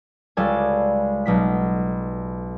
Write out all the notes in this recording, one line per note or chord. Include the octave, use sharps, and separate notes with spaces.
C#2 G3 A4 D5 G#5 G#6
B1 B2 B6